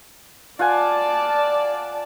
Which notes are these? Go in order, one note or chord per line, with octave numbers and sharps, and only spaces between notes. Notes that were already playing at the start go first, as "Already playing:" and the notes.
F4 D5 F#5 G#5 A5